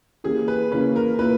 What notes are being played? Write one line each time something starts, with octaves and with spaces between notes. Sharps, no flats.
E3 A#3 C#4 G4 G#4
B4
C#3 E3 A#3 C#4 B4
A#4
A#2 A#3 E4 B4